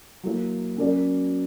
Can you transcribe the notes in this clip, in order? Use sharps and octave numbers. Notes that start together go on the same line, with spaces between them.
F#3 A#3 E4
F#3 C#4 F#4 A#4 D5